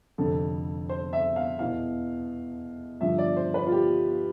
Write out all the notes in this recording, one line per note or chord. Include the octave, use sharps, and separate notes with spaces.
F1 F2 D3 A4
C5
E5
F5
E2 B2 B3 E4 F5
G2 D3 F3 E5
D5
C5
B4
F4
G4